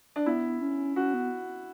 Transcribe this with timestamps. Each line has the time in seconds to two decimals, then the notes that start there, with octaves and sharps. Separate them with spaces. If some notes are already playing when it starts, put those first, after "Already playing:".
0.16 D4
0.26 B3 E4
0.62 C#4
0.96 C#4 F#4
1.14 B3